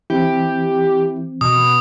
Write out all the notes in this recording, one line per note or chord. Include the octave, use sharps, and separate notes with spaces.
E3 C4 E4 G4
B2 D#6